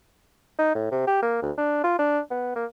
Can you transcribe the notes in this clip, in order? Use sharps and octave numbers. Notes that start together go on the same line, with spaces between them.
D#4
A2
C3
G4
A#3
D2
D4
F4
D4
B3
A#3